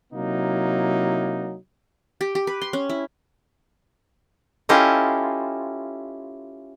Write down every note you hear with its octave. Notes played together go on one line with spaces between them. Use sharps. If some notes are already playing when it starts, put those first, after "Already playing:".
C3 F#3 A#3 D#4 E4
G4
G4
B4
C6
C#4
E4
C#4 E4 F4 G4 A4 D#5